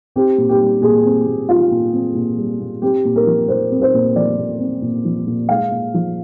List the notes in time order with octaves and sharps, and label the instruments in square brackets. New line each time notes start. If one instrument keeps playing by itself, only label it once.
[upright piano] C4 G4
A#2
G4
G3
A#2 G#4
C4
A#2
G3 F4
A#2
C4
A#2
G3
A#2
C4 G4
A#2
A#4
F3
A#2 C5
C4
C5
A#2
F3 D5
A#2
C4
A#2
F3
A#2
G#3 F5
A#2
F3